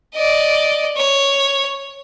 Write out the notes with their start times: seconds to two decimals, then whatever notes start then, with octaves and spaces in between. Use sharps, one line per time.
0.15 D5 D#5
0.97 C#5